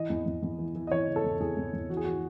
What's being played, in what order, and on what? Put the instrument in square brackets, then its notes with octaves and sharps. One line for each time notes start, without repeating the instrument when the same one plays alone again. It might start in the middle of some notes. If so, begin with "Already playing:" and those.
Already playing: [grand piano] E3 D#5
E2
E2
E2
E3
E3
D#5
E3 C#5
C#3
A4
E2
E2 G#4
E2
E2
E3 F#4
G#4
E3 F#4